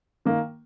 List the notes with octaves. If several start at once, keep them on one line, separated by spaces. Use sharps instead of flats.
D#3 A#3